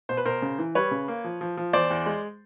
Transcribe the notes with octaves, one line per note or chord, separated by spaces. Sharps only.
B2 C5
B4
B2 A#4 C5
C#3
E3
G3 B4 C#5
C#3
A#3
F3
F3
F3
E2 C5 D5
E2
G#3